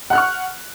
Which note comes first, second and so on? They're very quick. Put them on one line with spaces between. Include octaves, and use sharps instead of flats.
F#5 F#6 F6 C#6